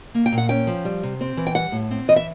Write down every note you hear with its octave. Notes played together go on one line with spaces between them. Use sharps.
A#3
G5
A#2
F#5
C#4 G5
F3
G3
C3
C4
E3
G5
G3 F#5
A2
C4
E3 D#5
E5